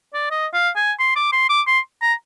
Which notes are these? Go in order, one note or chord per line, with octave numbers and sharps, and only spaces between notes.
D5
D#5
F5
G#5
C6
D6
C6
D6
C6
A#5